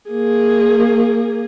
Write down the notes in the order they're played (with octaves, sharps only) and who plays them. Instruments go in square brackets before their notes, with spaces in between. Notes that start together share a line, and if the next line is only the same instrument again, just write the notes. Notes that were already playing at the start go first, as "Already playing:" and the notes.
[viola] A#3 G#4